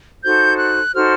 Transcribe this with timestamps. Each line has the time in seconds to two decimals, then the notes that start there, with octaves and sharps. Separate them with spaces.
0.23 D#4 F#4 A4 C5 G6
0.58 F#6
0.94 D#4 F#4 A4 C5 F6